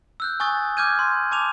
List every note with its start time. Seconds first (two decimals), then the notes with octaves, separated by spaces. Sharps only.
0.20 E6 F#6 G6
0.40 G#5 C#6 D#6 A6
0.77 D6 F6 G6 G#6 D#7
0.99 C6
1.31 A5 D6 F7